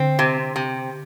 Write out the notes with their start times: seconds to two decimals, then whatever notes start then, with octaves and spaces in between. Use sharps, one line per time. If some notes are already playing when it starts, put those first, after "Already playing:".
Already playing: D3 C4
0.19 C3
0.56 C3